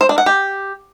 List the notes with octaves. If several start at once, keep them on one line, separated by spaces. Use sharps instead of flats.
C5
D4
F#5
G4